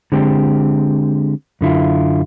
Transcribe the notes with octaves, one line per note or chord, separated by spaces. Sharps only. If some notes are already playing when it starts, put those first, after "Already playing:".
D3 G#3 C4 G4
F#2 D3 E4 F4